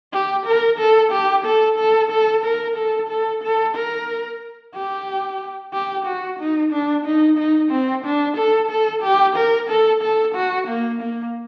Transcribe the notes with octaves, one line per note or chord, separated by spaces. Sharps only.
G4
A#4
A4
G4
A4
A4
A4
A#4
A4
A4
A4
A#4
G4
G4
F#4
D#4
D4
D#4
D#4
C4
D4
A4
A4
G4
A#4
A4
A4
F#4
A#3
A#3